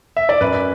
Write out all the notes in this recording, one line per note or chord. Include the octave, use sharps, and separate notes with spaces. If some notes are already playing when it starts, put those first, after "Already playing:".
E5
D5
F#2 B4